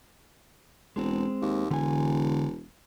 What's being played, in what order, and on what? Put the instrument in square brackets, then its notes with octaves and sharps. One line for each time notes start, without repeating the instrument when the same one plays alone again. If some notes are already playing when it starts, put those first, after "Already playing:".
[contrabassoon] E1 [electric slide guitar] G#3 C4
[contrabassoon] D#2
[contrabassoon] E1 [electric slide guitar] D3 G#5